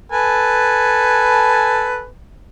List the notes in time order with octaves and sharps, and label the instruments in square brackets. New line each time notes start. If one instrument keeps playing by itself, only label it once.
[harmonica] A4 B4 G#5